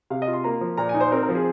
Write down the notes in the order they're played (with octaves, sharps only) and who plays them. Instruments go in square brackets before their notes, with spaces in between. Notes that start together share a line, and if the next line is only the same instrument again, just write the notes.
[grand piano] C3 F5
D#5
F4
C6
A#3 A#5
F3
A#2 A#5
G#5
D#4
C5
C4 A#4
A#4
F3
G#4